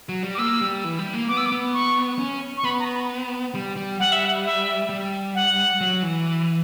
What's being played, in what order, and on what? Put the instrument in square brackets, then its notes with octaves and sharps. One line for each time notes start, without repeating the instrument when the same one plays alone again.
[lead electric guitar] F#3
G3
[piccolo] D6
[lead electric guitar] A#3 [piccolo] E6
[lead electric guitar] G3
E3
G3
A#3
[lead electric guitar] B3 [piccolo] D6
[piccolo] E6
D6
[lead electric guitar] B3
[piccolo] C#6
[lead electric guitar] C#4
[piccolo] C#6
[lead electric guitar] B3 [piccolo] B5
[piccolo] A#5
B5
[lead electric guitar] G3
G3
[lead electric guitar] G3 [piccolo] F#5
[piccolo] E5
F#5
E5
[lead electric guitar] G3
[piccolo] F#5
[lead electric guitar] F#3
E3